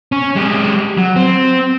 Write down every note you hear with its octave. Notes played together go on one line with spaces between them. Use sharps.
C#4
G#3 G4
F#3
C4